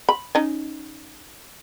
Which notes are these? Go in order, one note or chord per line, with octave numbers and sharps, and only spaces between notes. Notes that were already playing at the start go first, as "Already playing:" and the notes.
B5
C#4 D#4